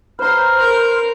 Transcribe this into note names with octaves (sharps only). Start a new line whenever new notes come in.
B4 C5 A#5 C6 F6
A#4